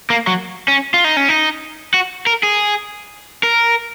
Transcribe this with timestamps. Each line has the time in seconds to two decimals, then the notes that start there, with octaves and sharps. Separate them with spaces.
0.10 A#3
0.27 F#3
0.68 C#4
0.94 F4
1.04 D#4
1.17 C#4
1.29 D#4
1.94 F#4
2.27 A#4
2.43 G#4
3.43 A#4